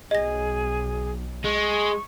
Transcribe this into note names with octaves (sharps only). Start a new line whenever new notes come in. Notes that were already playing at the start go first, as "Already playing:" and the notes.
B1 G#4 D#5 A#6
G#3 C#6